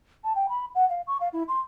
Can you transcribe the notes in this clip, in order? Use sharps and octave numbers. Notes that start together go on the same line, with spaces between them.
A5
G5
B5
F#5
F5
C#6
F5
E4
C6